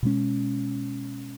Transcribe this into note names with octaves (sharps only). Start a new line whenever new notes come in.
B2 G#3 C#4